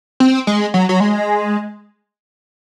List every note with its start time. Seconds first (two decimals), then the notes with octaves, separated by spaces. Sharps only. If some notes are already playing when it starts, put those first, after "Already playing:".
0.20 C4
0.47 G#3
0.74 F#3
0.89 F#3
1.00 G#3